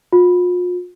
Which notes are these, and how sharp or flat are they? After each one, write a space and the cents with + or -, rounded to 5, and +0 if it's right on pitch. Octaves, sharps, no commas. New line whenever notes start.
F4 +40